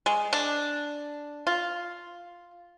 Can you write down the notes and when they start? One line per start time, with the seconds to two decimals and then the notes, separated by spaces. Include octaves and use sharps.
0.06 G#3
0.33 D4
1.47 F4